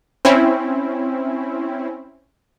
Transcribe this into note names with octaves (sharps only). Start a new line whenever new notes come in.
C4 C#4 E4